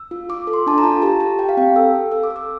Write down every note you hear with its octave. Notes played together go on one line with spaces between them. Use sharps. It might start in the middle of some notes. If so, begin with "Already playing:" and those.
Already playing: E6
F4
F4 D6
A4
C6
D4 A5
A#5
F4
G4 A5
G4
G4 G5
F5
C4 G5
A4 E6
A4
A4 E6
D6
A4
E6